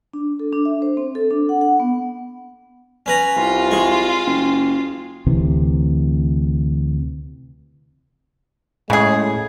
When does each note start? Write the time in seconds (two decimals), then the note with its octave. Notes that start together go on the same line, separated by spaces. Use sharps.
0.13 D4
0.40 A4
0.53 D4
0.65 E5
0.82 C5
0.97 C4
1.15 A4
1.30 D4
1.49 F#5
1.61 F#5
1.80 B3
3.06 C#4 B4 A#5
3.37 C2 F4
3.71 G#3 C#6
4.26 F#1
5.26 D2 C3 E3
8.90 A2 C#3 G#3 G#4